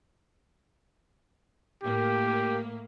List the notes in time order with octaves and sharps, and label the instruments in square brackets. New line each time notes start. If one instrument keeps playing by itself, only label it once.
[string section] A2 A#3 [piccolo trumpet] G4